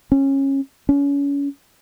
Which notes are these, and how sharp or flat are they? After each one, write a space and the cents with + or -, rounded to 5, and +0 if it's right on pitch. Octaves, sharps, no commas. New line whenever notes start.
C#4 -20
C#4 +30